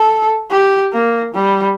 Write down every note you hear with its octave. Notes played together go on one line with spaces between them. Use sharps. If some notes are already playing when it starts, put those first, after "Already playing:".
Already playing: A4
G4
A#3
G3